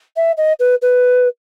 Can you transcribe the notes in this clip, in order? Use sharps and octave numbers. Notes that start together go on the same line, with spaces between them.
E5
D#5
B4
B4